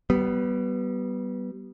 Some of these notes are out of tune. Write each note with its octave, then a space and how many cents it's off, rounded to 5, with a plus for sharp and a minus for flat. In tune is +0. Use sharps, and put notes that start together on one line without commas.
G3 -25 B3 +0